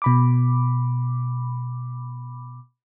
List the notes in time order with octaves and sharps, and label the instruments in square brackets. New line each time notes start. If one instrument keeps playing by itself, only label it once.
[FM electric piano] B2 B5 D6